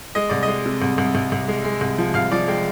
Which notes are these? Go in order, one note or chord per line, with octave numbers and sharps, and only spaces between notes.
G#3 D#5
C2 D5
D#5
G#3
C3
C2
C2
C2
C2
G#3
G#3
C2
F3
C2 F5
F3 D5
G#3 G5